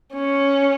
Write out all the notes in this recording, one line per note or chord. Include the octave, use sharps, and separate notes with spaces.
C#4